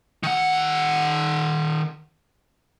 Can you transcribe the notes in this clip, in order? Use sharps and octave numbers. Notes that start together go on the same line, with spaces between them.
D#3 F#5